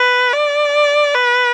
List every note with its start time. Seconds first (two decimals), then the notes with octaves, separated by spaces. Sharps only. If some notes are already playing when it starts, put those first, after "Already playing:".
Already playing: B4
0.33 D5
1.14 B4